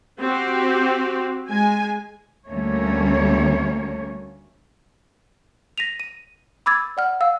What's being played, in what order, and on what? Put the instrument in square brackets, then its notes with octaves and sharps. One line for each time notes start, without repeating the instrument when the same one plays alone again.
[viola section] C4 F#4 G4
G#3 G#5
[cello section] D2 G3 A3 A#3 C#4 C#5
[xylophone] A#6 B6 D#7 F7
D#7
B5 D6 E6 G#6 A6
D5 F#5 F6
F5 E6